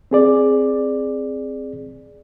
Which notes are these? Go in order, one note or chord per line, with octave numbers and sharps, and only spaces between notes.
C4 G#4 D5